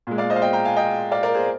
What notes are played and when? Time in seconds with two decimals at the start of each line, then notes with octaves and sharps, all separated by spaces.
0.07 A#2 G#3
0.18 D5 F5
0.30 C5 D#5
0.36 F5
0.42 D#5 G5
0.53 G5 A#5
0.65 F5 G#5
0.76 D#5 G5
1.12 D5 F5
1.23 A#4 D5
1.35 G#4 C5